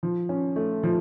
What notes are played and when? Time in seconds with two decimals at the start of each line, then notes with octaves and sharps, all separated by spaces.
0.03 F3
0.29 C#4
0.56 A3
0.83 F3